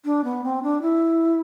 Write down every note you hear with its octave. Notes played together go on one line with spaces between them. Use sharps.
D4
B3
C4
D4
E4